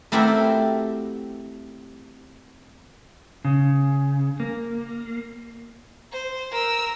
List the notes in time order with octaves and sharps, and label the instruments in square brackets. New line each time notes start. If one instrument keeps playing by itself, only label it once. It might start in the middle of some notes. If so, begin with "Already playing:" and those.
[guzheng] A3 C4 E4 F#4 G4 A#4
[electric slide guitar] C#3
A#3
[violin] C5
A#4 E6